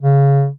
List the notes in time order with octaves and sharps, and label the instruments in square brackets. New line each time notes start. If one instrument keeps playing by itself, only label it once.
[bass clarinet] C#3